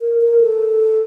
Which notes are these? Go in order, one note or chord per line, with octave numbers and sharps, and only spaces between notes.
A#4
A#4
A4